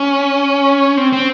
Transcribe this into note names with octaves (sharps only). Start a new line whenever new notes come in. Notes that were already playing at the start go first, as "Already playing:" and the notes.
Already playing: C#4
C4
C4